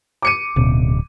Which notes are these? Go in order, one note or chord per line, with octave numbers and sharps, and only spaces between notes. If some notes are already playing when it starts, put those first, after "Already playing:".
D6 C#7 D#7
D1 B2 C#4